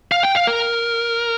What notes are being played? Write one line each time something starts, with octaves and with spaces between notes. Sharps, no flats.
F5
G5
F5
A#4